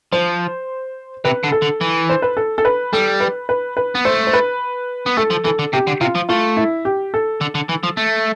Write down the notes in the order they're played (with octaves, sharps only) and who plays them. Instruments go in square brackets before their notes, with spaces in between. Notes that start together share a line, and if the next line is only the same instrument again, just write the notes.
[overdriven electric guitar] F3 [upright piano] C5
[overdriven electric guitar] C3 [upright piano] B4
[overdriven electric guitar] D3
[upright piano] A4
[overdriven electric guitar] D3
E3
[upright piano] C5
B4
A4
A4
B4
[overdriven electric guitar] G3 [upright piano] A4
[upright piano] B4
B4
B4
[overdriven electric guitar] B3
[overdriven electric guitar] A3 [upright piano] C5
[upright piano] C5
B4
[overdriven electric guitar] B3
[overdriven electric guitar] A3 [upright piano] A4
[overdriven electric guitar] F3
[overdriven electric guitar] E3 [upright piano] A4
[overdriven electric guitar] D3
[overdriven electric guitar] C3 [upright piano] G4
[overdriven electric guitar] D3
[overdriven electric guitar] C3 [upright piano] F4
[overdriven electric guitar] F3
[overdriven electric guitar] A3 [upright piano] F4
[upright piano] E4
G4
A4
[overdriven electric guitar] D3
D3
E3
F3
A3